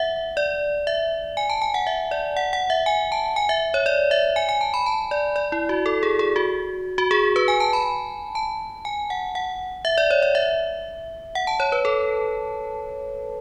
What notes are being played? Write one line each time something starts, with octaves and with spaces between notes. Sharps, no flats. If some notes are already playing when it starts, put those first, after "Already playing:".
Already playing: E5 F#5
D5
E5
G#5
A5
G#5
F#5
E5
D5
F#5
F#5
E5
G#5
A5
G#5
E5
C#5
D5
E5
G#5
G#5
A5
B5
A5
D5
D5
E4
F#4
A4
G#4
G#4
F#4
F#4
G#4
B4
G#5
A5
B5
A5
G#5
F#5
F#5
E5
D5
C#5
D5
E5
F#5
A5
C#5
B4
A4